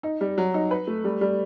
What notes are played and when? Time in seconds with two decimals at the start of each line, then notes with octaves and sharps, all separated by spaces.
0.03 D#4
0.21 G3
0.38 F#3
0.54 D#4
0.71 B4
0.87 A3
1.04 G3
1.21 G3